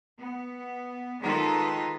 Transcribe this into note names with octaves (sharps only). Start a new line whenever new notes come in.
B3
D#3 G#3 D#4 F4 A4 B4